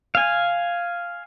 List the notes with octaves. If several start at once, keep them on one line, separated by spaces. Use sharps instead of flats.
F5 G#5